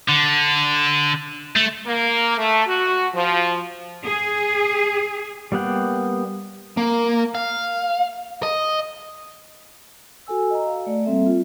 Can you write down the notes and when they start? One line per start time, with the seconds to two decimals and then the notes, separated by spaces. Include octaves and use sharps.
0.08 D3
1.56 A3
1.87 A#3
2.38 A3
2.67 F#4
3.14 F3
4.05 G#4
5.52 G3 A#3 B3 F#5 G5
6.77 A#3
7.35 F5
8.43 D#5
10.27 F#4 A4 G#5 E6
10.50 D#5 A#5
10.66 F5
10.87 A3 D5
11.05 G3 A#3 C4 A4 E5
11.26 F4